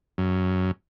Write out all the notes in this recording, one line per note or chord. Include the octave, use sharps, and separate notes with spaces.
F#2